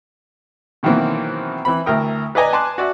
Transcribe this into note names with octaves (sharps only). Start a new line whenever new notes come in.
B2 D#3 E3 F#3 A#3 C4
E3 C4 B5
D2 E4 A#4 G5 D#6
B4 D5 D#5 G#5 A#5
G#5 A5 C6 D6 F#6
F#4 D5 E5